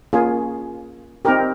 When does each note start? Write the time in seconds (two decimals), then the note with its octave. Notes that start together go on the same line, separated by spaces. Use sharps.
0.13 A#3 C#4 F4 G#4
1.25 C4 D#4 G4 A#4